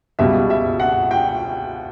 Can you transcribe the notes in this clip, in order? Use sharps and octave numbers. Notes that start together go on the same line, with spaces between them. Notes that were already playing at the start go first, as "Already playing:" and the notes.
C#2 B2 G3 E5
E5
F#5
G5